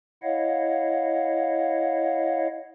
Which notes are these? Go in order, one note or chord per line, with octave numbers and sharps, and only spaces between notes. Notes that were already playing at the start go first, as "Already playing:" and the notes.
E4 C#5 D#5 F5 F#5